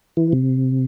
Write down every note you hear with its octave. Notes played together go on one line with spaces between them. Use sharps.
E3
C3